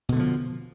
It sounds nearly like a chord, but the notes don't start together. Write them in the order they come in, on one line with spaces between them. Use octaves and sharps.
B2 D3 A3 F3